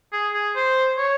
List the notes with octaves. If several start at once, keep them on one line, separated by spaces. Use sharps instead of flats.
G#4
G#4
C5
C#5